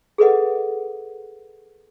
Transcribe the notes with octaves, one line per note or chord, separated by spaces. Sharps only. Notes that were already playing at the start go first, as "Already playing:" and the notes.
G#4 A4 B4 D#5 F#5